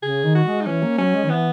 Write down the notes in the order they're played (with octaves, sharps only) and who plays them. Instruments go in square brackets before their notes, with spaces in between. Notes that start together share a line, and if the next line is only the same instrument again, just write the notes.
[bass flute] C#3 [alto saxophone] G#4
[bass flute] D#3
[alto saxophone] F#4
[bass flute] G#3
[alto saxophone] D#4
[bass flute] E3 [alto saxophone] C#4
[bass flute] A#3
[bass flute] F#3 [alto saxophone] C#4
[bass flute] G#3
D#3
[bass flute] E3 [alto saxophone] B3